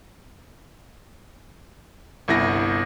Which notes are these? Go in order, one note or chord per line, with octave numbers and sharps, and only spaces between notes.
G1 C2 E4 A#6